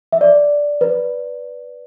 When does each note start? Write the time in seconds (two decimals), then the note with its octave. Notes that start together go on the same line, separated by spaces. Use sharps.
0.12 E5
0.21 D5
0.81 B4